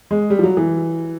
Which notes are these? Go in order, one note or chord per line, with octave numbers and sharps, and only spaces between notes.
G#3
G3
F3
F#3
E3